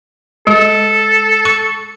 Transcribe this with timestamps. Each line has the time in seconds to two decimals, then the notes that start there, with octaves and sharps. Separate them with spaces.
0.47 G#3 A4
1.45 C#6